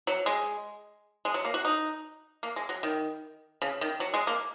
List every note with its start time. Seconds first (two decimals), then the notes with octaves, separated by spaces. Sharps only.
0.07 F#3
0.26 G#3
1.25 G#3
1.34 F#3
1.45 A#3
1.54 F#4
1.65 D#4
2.43 A#3
2.56 G#3
2.69 F#3
2.83 D#3
3.62 C#3
3.81 D#3
4.00 F#3
4.14 G#3
4.27 A#3